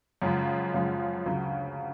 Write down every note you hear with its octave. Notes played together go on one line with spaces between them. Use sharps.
F#2 C#3 F3 G#3
F#2 C#3 F3 G#3
D2 C#3 F#3